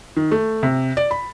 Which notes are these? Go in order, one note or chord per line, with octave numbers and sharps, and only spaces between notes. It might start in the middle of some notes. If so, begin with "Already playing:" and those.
D#3
A3
C3
D5
B5